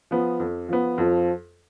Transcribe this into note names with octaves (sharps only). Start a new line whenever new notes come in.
F3 B3
F2
F3 B3
F2 F3